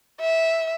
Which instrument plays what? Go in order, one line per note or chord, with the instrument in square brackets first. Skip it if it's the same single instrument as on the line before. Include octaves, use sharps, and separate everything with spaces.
[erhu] E5